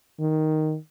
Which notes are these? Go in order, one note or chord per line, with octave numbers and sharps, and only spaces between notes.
D#3